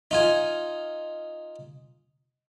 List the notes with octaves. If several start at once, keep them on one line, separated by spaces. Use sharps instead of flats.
D#4 F4 G#5